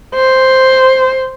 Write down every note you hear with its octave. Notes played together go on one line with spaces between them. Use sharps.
C5